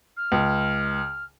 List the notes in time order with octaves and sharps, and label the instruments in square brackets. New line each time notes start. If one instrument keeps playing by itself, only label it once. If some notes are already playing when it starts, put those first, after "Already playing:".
[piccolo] F6
[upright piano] C#2